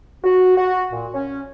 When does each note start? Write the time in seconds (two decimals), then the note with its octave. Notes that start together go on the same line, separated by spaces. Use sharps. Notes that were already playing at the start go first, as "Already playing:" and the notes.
0.24 F#4
0.57 F#4
0.92 A#2
1.14 C#4